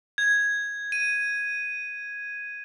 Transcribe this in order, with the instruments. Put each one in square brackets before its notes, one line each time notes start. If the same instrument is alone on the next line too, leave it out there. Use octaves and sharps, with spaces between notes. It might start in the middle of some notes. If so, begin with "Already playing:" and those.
[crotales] G#6
D#7